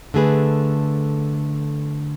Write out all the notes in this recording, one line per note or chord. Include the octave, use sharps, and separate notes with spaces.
D3 A3 G#4 B4